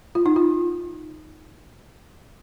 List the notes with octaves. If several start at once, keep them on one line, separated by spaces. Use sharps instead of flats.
F4
D#4
F4